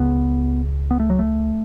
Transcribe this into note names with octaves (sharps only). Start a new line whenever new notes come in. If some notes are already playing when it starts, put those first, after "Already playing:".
Already playing: C#2 C#3 B3
B3
A3
F#3
A3